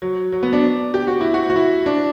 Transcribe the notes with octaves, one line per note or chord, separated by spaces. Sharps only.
F#3
F#3
B3
D4
G4
F#4
E4
F#4
F#4
E4
D4